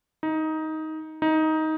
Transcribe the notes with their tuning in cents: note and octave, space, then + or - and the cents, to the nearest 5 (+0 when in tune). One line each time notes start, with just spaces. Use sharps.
D#4 +15
D#4 +15